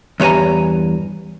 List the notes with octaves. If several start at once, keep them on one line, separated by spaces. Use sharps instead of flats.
E2 G2 C#5 G#5 A#5